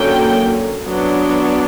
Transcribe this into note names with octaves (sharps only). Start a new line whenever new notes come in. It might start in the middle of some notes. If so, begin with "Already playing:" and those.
Already playing: D3 F#3 A#3 C#4 G5
F#3 B3 D4